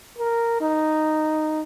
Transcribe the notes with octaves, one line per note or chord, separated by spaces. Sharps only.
A#4
D#4